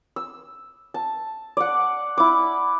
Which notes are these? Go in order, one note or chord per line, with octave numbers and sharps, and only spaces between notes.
E6
A5
D5 F#5
E4 D6